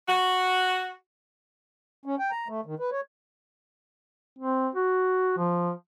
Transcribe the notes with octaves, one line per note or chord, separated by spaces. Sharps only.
F#4
C#4
G5
A#5
A3
D#3
B4
C#5
C4
F#4
F3